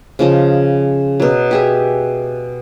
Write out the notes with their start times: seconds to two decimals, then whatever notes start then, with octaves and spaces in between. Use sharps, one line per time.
0.19 C#3 F3 D#5
1.20 B2 F#3
1.51 G4 G#4 E5